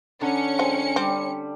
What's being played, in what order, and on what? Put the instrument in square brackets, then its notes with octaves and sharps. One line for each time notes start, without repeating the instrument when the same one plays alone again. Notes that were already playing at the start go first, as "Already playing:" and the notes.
[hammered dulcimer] D3 A#5 [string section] C#4 C#7
[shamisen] F3 G#3 C4
[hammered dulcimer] G3 [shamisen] C4